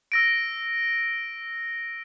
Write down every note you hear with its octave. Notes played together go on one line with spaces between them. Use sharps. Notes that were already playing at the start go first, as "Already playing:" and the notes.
E6 A#6 D7